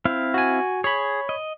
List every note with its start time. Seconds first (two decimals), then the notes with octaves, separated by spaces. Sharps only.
0.05 C4 E4 F5
0.34 F#4 G#5
0.84 G#4 C#5 B5
1.29 D#5